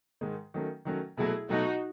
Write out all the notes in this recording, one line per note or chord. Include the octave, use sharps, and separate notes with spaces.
G#2 D#3 G#3
D#3 F#3 A3 C#4
D#3 F#3 A3 C#4
B2 F#3 A3 E4 G#4
B2 F#3 A3 D#4 F#4